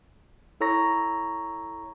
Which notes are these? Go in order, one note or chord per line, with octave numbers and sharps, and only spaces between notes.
E4 A4 C#5 A#5 C#6 A#6